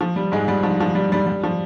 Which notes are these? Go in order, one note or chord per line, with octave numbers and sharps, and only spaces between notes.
F3
G3
G#2 G#3
G3
F3
F3
G3
G3
G3
F3